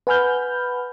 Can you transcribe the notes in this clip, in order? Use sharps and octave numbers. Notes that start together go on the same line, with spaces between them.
B4 F#5 G#5 B5 F6 G6